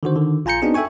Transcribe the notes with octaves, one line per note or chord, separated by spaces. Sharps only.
D3 D#3 F#4 C5
D3 D#3
A#1 F4 G#5 A#5 G6 C#7
B3 C4 D4 D#4 F#4 G#4
A4 E5 G5 G#5 C#6